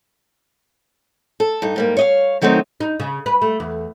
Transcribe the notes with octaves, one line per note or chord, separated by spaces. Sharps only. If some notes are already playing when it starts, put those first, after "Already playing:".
A4
G2 D#4
G#2 G3 A#3
C#5 D#5 F5
D#3 F#3 A3 C4 D#4
D#4
C#3
B4
A3
E2